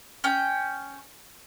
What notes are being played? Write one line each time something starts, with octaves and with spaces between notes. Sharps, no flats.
C#4 G5